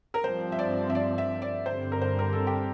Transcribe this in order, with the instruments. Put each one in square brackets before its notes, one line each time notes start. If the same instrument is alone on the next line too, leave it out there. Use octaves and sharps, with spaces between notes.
[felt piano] A#4
[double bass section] G2 F3 C4 [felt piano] C5
[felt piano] E5
D5
E5
D5
E5
D5
[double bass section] G2 D3 G3 C4 [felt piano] C5
[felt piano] A#4
C5
A#4
A4
G4